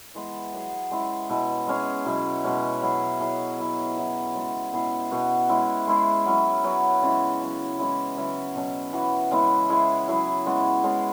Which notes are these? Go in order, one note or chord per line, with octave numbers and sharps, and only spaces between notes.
E3 G#3 B3
F#3 B3 G#4
G#3 C#4 E4
B2 B3 E4
G#3 C#4 G#4
B2 F#3 E4
B2 G#3 C#4
F#3 E4 G#4
F#3 E4 G#4
F#3 B3 E4
F#3 E4 G#4
C#3 G#3 C#4 F#4
B2 B3 E4 G#4
B2 B3 F#4
G#3 C#4 E4
G#3 E4 G#4
F#3 C#4 E4
F#3 B3 F#4
C#3 G#3 C#4 E4
C#3 F#3 B3
E3 G#3 C#4 E4
C#3 F#3 C#4 E4
B2 F#3 C#4
E3 B3 F#4
C#3 G#3 B3 E4
G#3 E4 G#4
F#3 E4 G#4
C#3 G#3 B3 F#4
C#3 G#3 C#4 G#4